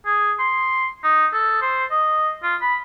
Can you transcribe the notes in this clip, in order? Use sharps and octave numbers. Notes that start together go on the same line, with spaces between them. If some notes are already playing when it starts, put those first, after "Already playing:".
G#4
C6
D#4
A4
C5
D#5
F4
B5